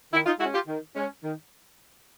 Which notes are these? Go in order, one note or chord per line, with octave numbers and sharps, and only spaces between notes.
D#3 E4
D#4 F4
G#3 C#4 E4 F#4
F4 G4
D#3
G#3 C#4
D#3